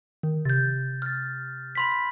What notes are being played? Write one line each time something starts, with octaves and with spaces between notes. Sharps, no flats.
D#3
C3 G6 A6
F6 A6
B5 C6 B6